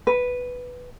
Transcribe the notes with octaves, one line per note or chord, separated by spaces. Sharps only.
B4